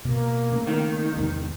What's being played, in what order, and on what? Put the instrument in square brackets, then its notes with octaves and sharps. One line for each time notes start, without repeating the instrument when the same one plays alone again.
[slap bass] B2 [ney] A#3
[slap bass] C#3 A3 C4
[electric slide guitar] D#3
[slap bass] E2 G#2 C3